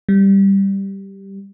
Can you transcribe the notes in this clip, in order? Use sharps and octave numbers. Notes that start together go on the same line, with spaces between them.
G3